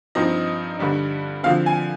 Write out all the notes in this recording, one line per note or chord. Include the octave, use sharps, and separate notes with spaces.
G2 F3 C4 D#4 D#5
G2 D3 G3 D4
D3 F3 C4 F5
G#5